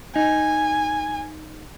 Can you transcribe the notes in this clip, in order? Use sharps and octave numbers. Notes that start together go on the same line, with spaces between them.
D#4 G#5